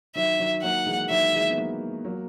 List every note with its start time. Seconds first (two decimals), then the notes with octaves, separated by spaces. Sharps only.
0.16 D#3 F#3 E5
0.39 D#3 F#3
0.63 F#3 A#3 F#5
0.86 E3 G#3
1.10 D#3 F#3 E5
1.34 E3 G#3
1.50 B3
1.57 F#3 A#3
2.04 F#3 A#3